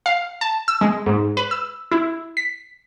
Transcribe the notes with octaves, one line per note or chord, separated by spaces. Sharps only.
F5
A5
E6
G#3
G#2
B4
E6
E4
B6